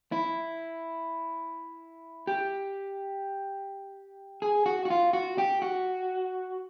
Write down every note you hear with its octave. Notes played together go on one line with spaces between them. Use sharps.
E4
G4
G#4
F#4
F#4
F4
F#4
G4
F#4